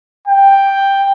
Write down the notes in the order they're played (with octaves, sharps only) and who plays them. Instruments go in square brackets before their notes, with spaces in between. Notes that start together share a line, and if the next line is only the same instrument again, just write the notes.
[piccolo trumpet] G5